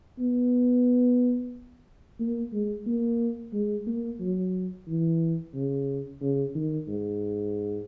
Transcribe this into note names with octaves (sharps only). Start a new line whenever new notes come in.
B3
A#3
G#3
A#3
G#3
A#3
F#3
E3
C#3
C#3
D#3
G#2